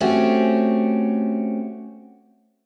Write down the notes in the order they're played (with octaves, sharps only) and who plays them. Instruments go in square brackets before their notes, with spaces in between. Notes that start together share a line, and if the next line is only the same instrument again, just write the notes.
[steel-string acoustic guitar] A3 C4 C#4 F#4 G4